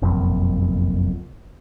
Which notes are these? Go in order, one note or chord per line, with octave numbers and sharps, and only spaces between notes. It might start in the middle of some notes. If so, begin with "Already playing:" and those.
F#1 B1 F2 A#2